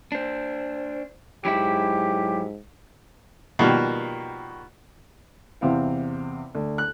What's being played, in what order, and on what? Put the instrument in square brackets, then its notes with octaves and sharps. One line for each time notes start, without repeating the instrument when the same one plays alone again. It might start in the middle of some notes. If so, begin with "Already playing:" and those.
[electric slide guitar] D4 C5
[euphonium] G#2 [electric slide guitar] F#3 E4 E5 [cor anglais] G4
[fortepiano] B2 D#3 F3 G3 A#3
E2 C3 C4 F5
D2
F#6